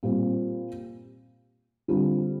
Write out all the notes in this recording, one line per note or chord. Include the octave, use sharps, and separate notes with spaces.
A#2 G3 C4
D3 G3 C4 F4